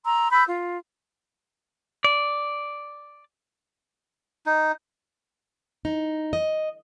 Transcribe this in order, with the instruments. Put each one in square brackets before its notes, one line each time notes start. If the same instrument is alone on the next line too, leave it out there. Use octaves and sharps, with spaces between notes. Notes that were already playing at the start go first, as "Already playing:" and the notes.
[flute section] A#5 C6 E6
B5 E6 G6
F4
[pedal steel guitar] D5
[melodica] D#4
[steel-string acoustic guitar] D#4
D#5